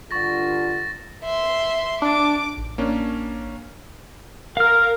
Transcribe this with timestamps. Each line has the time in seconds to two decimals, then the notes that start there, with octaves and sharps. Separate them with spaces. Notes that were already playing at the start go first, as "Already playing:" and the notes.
0.11 G2 D3 F4 C#6 A6 A#6
1.24 E5 C6
2.02 D4 D6
2.57 A1
2.78 A#3 C#4 D4
4.57 A#4 F5 F6